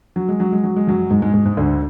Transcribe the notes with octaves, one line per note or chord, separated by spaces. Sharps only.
F#3
G#3
F#3
G#3
F#3
G#3
F#2 F#3
G#2 G#3
G#2 G#3
G#2 G#3
G#2 G#3
D2 D3